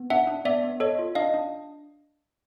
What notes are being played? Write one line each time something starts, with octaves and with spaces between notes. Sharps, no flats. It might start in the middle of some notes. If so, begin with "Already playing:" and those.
Already playing: B3
D4 E5 F#5
D4
B3 D5 E5
B3
A4 C#5 D#5
F4
D4 D#5 F5
D4